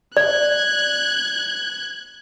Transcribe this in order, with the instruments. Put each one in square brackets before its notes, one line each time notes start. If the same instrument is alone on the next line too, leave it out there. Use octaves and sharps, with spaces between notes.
[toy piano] D5 [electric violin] F#6 G#6